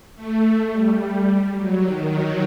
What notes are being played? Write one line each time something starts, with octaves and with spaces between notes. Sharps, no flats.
A3
G3
F#3
D#3
F#3